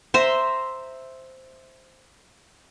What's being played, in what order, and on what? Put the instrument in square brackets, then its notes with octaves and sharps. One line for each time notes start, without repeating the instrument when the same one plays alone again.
[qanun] C5 E5 A#5 C6